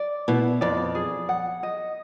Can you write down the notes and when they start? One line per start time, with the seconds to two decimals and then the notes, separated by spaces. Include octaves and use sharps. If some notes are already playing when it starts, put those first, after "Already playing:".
Already playing: D5
0.28 B2 E4
0.61 F2 D5
0.95 G#4
1.29 F#5
1.63 D#5